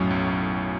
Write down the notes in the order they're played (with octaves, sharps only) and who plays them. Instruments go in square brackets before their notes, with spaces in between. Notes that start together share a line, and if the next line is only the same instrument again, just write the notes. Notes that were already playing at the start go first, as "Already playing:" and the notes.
Already playing: [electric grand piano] B1 A2 F#3 C#4 [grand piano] F#2
[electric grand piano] B1